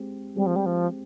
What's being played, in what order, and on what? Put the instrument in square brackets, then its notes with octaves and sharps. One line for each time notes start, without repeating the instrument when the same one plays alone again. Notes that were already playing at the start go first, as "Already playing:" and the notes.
Already playing: [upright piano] G#3 C4 G4
[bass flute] G3 [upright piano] G#3 C4 G4
[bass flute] F3
G3
F3